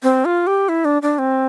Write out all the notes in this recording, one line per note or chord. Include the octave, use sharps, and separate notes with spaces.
C4
F4
G4
E4
D4
D4
C4